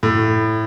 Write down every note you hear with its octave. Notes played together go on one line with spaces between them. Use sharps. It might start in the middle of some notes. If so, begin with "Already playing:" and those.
A2